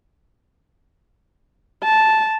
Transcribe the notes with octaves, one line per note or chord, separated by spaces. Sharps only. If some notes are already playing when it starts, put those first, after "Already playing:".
A5